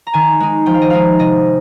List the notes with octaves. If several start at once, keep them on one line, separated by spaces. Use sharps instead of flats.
A#5
D#3 G#5
G#3 D#4
F3 G5
F5
D#5
G#3 D#4 F5
C3 D#5